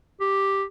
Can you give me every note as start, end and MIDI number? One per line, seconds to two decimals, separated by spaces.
0.20 0.64 67